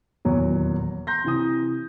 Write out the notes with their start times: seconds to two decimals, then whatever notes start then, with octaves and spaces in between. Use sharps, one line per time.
0.25 D#1 E2 F#3 B3
1.07 A#5 C6 G6 A#6
1.24 C3 E3 D#6